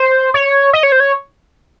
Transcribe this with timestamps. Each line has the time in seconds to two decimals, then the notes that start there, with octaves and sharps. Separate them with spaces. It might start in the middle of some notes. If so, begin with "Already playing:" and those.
Already playing: C5
0.34 C#5
0.73 D#5
0.83 C#5
0.92 C5
1.00 C#5